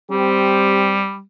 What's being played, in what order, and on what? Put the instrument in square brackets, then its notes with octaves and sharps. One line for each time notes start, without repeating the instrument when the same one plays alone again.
[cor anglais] G3 [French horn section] C4 G4